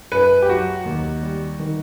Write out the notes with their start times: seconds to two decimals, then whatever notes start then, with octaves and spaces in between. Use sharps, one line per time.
0.12 F#2 B4
0.42 G4
0.49 F#3 F#4
0.86 D#2
1.22 G3
1.59 D#3